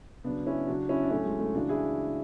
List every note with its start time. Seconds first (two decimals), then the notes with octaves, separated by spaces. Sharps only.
0.24 C#3 F#3 B3 D4
0.46 C#4 E4
0.67 C#3 F#3 D4 F#4
0.89 C#4 E4
1.03 D4
1.10 A2 F#3 A3 C#4
1.25 G#3
1.40 A3
1.54 C#3 E3 D4 F#4
1.69 E4 G#4